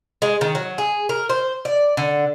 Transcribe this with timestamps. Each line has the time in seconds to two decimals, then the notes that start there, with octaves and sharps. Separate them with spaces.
0.22 G#3
0.41 D#3
0.55 F#3
0.78 G#4
1.09 A#4
1.29 C5
1.65 D5
1.97 D3